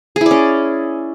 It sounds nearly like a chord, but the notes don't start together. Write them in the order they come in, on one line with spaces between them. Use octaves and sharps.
G#4 E4 D5 C#4